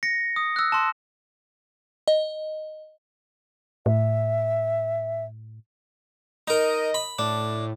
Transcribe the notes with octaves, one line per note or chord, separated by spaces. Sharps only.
A#6 C#7
D#6
E6 F#6
A5 C6
D#5
A2 E5
D#4 A#4 D#5
B5
A2 D4